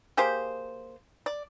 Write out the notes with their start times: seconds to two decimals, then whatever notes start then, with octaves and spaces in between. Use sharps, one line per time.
0.17 A#3 G4 G#4 C5
1.26 D5